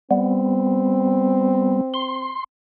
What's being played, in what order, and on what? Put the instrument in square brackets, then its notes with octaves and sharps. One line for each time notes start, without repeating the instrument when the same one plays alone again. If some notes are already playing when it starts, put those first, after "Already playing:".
[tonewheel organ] G3 B3 [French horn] C4
[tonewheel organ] C6